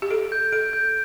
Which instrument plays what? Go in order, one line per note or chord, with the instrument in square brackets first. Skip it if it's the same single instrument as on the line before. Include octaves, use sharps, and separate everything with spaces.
[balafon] G4
[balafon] A4 [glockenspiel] D7
[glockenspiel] G6
[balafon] A4 [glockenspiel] D7
[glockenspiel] G6